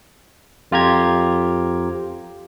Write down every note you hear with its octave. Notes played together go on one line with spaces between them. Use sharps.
F2 F4 G4 A#5 G#6